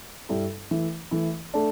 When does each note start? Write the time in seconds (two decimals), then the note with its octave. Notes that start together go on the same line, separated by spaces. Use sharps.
0.29 G2 G3 E4 A4
0.71 E3 A3 E4
1.11 E3 A3 E4
1.54 A3 D4